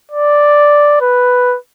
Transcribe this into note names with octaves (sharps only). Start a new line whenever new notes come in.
D5
B4